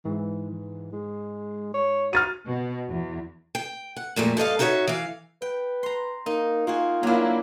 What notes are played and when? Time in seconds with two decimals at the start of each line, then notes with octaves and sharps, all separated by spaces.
0.05 G#2 E3
0.51 E3
0.93 G#3
1.74 C#5
2.13 F#4 F6 A6 D#7
2.46 B2
2.86 E2
3.55 G5
3.96 F#5
4.16 F2 A#2 G#3 A3
4.37 G2 A4 D#5 F5
4.59 D#4 F#4 A#4 C5 C#5 E5
4.87 E3 F5
5.42 B4 G5
5.83 A#5 C6
6.26 A#3 D#4
6.67 A#3 F4 F#4 G#4
7.03 F#3 A#3 D4 E4